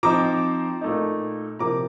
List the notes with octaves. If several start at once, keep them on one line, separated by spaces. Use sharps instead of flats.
F3 C4 D#4 A#5 D6
A#2 A3 D#4
C3 F3 A#3 A#5 D6